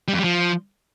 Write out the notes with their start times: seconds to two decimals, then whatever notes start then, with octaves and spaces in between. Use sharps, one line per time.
0.08 G3
0.13 F2
0.19 G3
0.24 F3